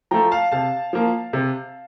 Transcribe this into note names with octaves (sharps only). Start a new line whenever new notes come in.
F3 A3 G5 A#5
F5 A5
C3 F5 A5
F3 A#3
C3